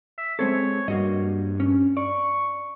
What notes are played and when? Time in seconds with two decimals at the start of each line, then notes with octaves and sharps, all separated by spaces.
0.18 E5
0.39 G#3 C4 A4 C#5
0.88 G2 A#3 F#4 D#5
1.60 C#4
1.97 D5 C#6